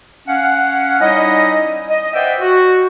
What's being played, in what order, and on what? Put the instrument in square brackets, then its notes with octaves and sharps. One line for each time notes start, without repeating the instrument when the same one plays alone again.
[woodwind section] C#4 F5 F#5
G3 C#4 D#4 E4 C#5 D#5
D#5
B4 C5 D5 E5 F#5 G5
F#4